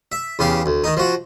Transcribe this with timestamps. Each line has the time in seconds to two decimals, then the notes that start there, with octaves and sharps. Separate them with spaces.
0.12 E5
0.39 E2 C#3 G4 F5
0.66 D2
0.84 D#3 D#4
0.97 F3 F#4